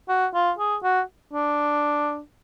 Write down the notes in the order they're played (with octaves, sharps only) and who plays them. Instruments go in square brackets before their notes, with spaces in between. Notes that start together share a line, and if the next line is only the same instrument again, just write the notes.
[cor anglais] F#4
F4
G#4
F#4
D4